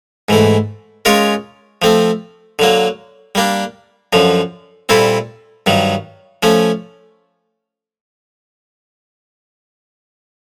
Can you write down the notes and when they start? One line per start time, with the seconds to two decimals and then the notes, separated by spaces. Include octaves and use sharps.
0.29 G#2 E3 A3
1.05 G#3 C#4 F4 A#4 C#5
1.82 F3 A3 C4
2.59 D3 F#3 A#3
3.35 G3 A#3 D4
4.13 F#2 D3 F3
4.89 A#2 G3 C4 E4 A4
5.66 G2 D#3 F#3
6.43 F3 A3 C#4